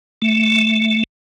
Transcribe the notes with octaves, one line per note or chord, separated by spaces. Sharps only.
A3